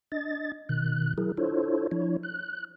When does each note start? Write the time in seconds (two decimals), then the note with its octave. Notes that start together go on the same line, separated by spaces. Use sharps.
0.12 D4 D#5 A6
0.69 B2 D#3 F#6
1.18 F#3 E4 G#4 A#4
1.37 D4 E4 F4 A4 C5 C#5
1.91 F3 D4 E4 C#5
2.23 F#6